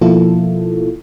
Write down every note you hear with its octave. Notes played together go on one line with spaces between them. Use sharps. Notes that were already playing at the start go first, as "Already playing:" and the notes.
B2 F3 A#3 E4 F4 A4